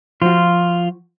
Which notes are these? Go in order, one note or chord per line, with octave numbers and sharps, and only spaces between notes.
F3 F4 F#4